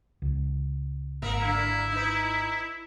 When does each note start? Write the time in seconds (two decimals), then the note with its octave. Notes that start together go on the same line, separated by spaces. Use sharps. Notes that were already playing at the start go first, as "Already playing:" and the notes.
0.22 C#2
1.22 G#1 A#3 A#4 E5
1.41 D3 A#3 E4
1.92 D#4 B4